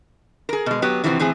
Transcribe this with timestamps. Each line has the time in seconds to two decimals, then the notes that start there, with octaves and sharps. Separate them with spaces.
0.49 G#4 A#4
0.66 B2 G#3
0.82 F#3 B3 G4
1.04 C3 E3 F3 C4 E4 F#4
1.19 A2 E3 C4 G#4